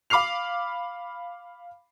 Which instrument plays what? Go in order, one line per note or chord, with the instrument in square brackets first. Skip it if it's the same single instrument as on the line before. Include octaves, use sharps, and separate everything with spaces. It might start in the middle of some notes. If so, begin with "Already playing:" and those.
[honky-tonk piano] F5 B5 D6 F6 C7 F7